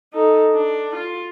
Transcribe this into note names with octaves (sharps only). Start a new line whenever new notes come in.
D#4 A4
D4
F4